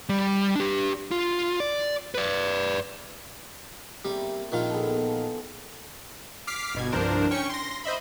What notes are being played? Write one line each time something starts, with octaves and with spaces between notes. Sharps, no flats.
G3
D4 G4
F4
D5
B4 D5
G3 A#3 C4 E4
A#1 D#3 F4
B3 G#4 A4
F3
D6 F6 B6 C7
G1 B2 G#6
C2 G2 F3 D4 A#4 C5
C#4 G5 C#6 C#7
C6 A#6
C5 D#5 E5 B5